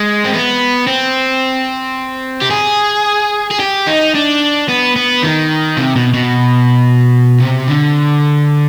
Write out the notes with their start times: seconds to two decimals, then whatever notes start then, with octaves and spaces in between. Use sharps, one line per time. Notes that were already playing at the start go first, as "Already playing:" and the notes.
Already playing: G#3
0.24 C4
0.33 B3
0.87 C4
2.41 G4
2.50 G#4
3.50 G#4
3.59 G4
3.87 D#4
4.14 D4
4.68 B3
4.96 B3
5.23 D#3
5.77 C3
5.96 B2
6.14 B2
7.40 C3
7.67 D3